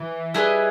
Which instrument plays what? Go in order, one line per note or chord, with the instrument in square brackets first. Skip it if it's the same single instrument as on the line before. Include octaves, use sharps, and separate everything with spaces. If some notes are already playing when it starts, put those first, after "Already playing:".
Already playing: [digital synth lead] E3
[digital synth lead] G3 [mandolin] E4 G#4 B4 D#5